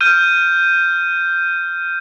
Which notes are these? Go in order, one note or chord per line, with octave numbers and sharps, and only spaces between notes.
F6 G6 D#7